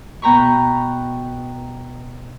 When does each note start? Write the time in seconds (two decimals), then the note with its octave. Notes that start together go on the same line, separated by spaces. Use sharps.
0.22 B2 B3 G5 A#5 B5 C#6